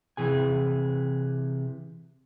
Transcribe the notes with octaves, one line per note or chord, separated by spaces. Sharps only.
C3 E3 G#4 G#5